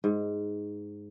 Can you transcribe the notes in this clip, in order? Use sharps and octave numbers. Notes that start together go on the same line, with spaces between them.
G#2